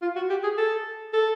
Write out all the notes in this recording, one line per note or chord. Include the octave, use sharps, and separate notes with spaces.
F4
F#4
G4
G#4
A4
A4